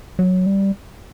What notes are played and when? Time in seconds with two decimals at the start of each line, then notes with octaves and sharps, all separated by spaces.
0.19 F#3
0.46 G3